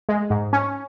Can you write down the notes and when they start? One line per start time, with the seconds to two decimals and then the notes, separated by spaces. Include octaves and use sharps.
0.09 G#3
0.30 G#2
0.53 C#4